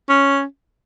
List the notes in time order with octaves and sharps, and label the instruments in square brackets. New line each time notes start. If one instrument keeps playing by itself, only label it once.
[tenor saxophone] C#4